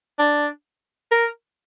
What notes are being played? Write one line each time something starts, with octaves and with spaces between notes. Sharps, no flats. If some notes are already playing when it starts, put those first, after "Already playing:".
D4
A#4